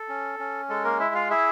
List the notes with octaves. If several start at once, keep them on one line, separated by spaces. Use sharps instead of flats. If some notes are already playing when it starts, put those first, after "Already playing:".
Already playing: A4
C#4
C#4
G#3 A4
A#3 A#4
E4 E5
F4 F5
E4 G#4 E5